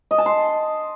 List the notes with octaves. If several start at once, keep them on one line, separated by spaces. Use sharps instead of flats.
D#5
A5
C6